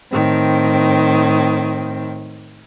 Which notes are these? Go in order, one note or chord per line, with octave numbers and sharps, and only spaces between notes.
A2 D#3 C4